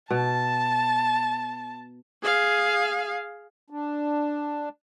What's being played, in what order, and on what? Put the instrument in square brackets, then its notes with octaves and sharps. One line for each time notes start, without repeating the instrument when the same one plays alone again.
[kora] B2 [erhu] A5
[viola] G#4 F5
[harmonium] D4